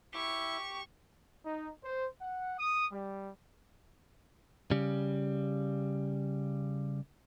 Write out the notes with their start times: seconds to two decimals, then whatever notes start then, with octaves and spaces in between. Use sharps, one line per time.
0.14 E4 G4 E5 C#6
1.45 D#4
1.83 C5
2.21 F#5
2.59 D#6
2.92 G3
4.71 C#3 G3